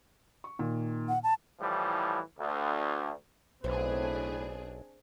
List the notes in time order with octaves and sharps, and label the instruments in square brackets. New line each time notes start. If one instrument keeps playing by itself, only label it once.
[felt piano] C#6
A#2 D#3
[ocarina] F#5
A5
[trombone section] A2 E3 F3 G3
D2
[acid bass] B1 [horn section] A2 B4 [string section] C4 D4 G#4 [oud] C5